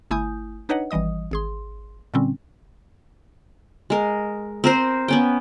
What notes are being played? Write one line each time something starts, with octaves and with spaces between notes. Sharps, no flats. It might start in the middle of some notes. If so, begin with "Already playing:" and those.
G1 A3 E4 G#5 D#6 G6
D4 D#4 B4 C#5 D#5 F#5
G#1 E3 G3 D#5 D#6
G#1 G#4 C6
A#2 D3 G3 C4 C#4
G#3 A#4
C4 A#4 C5
B3 C#4 G5